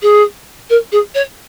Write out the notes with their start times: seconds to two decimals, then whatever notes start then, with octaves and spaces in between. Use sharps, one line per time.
0.02 G#4
0.70 A#4
0.92 G#4
1.15 C#5